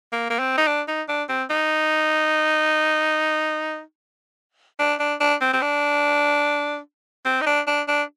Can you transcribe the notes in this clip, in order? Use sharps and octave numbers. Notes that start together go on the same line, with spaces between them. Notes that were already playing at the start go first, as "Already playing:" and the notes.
A#3
A#3
C4
D#4
D4
D#4
D4
C4
D#4
D4
D4
D4
C4
C4
D4
C4
D#4
D4
D4
D4